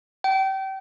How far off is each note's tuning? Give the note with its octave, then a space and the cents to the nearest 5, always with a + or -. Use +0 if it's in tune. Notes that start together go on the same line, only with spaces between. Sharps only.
G5 -30